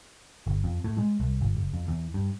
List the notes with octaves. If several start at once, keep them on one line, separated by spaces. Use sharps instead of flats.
G1
F2
A2
G#3
C2
G1
F#1
F2
E2
G2